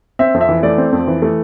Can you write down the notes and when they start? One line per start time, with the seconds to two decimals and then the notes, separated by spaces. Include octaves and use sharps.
0.19 C4 E5
0.34 F2
0.41 E5
0.49 E3
0.63 A3 D5
0.78 C4
0.92 F2
1.07 E3
1.22 A3